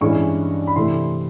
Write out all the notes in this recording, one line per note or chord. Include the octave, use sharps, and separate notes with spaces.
G2 E3 G#3 C#4 C#6
B5
C3 E3 A3 C6